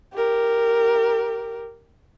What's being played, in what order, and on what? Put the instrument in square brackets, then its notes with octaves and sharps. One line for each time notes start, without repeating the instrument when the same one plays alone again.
[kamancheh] G4 A#4